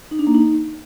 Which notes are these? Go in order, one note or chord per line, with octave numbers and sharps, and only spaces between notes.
D#4
D4
A#3
D#4